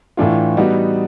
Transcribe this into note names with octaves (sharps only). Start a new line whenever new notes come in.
A2 E3 A3 D4 F4
G3 B3 D#4 F#4